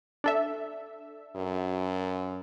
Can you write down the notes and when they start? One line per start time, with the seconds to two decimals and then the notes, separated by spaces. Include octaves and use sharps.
0.24 D4 A4 E5
1.36 F#2